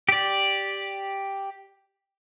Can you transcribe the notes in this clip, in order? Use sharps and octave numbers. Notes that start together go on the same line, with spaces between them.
G4 D5